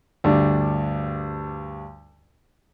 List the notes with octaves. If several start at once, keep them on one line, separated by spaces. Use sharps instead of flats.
D2 G2 D4